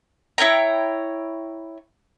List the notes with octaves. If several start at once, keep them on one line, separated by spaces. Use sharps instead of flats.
E4 C#5 G5 A#5